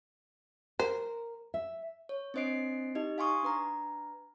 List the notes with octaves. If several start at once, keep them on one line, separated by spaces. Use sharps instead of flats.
A#4 C5
E5
C#5
C4 D4 C5 D#5 C7 D7
D#4 G4 D#5
F5 G#5 C6 C#6 D#6
D4 B4 A#5